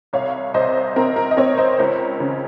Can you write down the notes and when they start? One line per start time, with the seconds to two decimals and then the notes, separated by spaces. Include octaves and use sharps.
0.13 C2 C#5 F5
0.54 C2 C5 D#5
0.96 C4 A#4
1.16 A#4
1.31 D#5
1.37 C4 A#4 C#5
1.58 C5 D#5
1.79 C#2 A#4 C#5
2.20 C#3